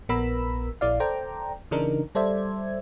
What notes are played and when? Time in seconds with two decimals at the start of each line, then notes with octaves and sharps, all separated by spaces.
0.09 A#1 B3 A#4 A#5 B5 E6
0.81 A#1 E4 D5 F5
1.00 A4 C5 D5 G5 A#5
1.71 C#3 E3 D4 D#4 A#4
2.15 G3 A4 C5 D5 E5 G#6